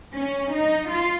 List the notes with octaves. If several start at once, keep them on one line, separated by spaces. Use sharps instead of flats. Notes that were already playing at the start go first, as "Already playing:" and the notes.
C#4
D#4
F4